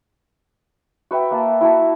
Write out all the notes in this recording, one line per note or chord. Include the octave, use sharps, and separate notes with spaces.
F#4 B4 E5 G5
A#3 E5 A5
E4 F#4 E5 A5